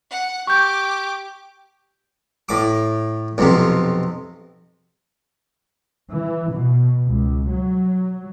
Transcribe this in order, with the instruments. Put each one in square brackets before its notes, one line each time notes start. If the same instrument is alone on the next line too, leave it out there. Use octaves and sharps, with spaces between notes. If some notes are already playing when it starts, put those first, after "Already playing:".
[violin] F#5
[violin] G4 D6 [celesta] C#6 G6
[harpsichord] A2 D6
B1 F2 C3
[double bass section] E3
B2
C#2
F#3